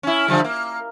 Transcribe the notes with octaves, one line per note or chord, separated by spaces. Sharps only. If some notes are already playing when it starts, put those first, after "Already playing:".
C#4 E4
D3 F3 G3
A#3